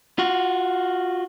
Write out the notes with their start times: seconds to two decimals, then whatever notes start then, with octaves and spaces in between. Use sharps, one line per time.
0.18 F4 F#4